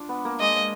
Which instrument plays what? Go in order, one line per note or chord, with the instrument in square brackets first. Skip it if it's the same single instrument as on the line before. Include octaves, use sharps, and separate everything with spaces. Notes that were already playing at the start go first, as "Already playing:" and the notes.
Already playing: [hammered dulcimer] D4 F4
B3
A#3
[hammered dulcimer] G#3 [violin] D#5